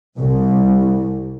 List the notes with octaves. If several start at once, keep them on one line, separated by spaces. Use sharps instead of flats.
C2